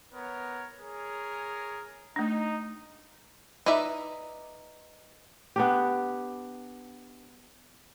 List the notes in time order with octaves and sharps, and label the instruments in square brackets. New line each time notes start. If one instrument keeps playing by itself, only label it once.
[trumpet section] B3 A#4 C#5
G#4 A#4 C#5
[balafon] A3 D4 [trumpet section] D#4
[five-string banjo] D#4 B4 D5 E5
[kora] B3 D4 G4